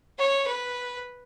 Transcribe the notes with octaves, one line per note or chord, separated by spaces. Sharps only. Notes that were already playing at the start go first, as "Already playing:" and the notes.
C#5
B4